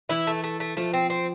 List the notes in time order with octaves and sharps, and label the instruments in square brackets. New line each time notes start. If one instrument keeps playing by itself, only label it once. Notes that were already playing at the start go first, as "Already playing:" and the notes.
[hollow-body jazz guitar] E3 [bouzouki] E4
[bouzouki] A3
A3
A3
[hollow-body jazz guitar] F3 [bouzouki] A3
[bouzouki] C4
C4